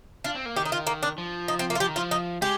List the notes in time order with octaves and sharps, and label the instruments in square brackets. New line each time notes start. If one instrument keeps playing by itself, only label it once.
[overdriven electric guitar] D4 [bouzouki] F4
[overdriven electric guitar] C4
A#3
[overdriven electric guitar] D#3 [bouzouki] G4
[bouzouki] D#4
F4
A#3
D4
[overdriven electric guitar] F3
[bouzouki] D#4
C4
A#3
F4
[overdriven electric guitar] F3 [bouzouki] G4
[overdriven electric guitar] D#3
[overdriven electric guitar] F3 [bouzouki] F4
[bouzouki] D#4
[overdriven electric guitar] G#3 [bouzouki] G4